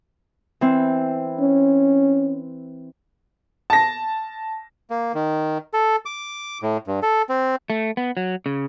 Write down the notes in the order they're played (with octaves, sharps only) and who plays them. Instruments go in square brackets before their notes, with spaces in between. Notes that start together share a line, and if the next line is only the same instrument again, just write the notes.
[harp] E3 C4
[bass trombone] C#4
[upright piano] A5 A#6
[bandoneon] A#3
D#3
A4
D6
A2
G2
A4
C4
[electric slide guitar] A3
B3
F#3
C#3